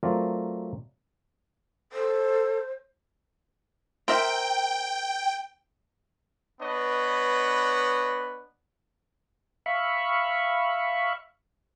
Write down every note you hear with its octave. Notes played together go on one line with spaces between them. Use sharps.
F#3 A3 C4 F4 A#4 D5
A4 C5
C4 A#4 E5 G5
B3 D4 B4 C#5 D#5
E5 F5 B5 C#6